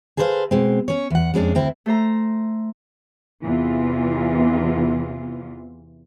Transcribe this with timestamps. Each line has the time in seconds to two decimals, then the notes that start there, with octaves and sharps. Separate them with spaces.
0.17 G#4 A4 B4 C5 D5 F5
0.51 B2 G#3 C4
0.88 C#4 C#5
1.10 E2 F#5
1.34 F2 G#3 C#4 D4
1.55 D2 C4 E4
1.86 A3 A4 C5 A#5
3.43 E2 C3 E3 F4